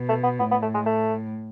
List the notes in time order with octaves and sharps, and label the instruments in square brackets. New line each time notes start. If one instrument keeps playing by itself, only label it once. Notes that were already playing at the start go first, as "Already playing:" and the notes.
Already playing: [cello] B2
[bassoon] A3
B3
[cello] A2 [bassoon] B3
[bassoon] B3
A3
G#3
A3